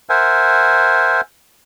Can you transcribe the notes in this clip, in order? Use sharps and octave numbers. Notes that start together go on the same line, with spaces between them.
A#4 C5 E5 F#5 G#5